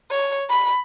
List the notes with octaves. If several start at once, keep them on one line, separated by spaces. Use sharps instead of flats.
C#5
B5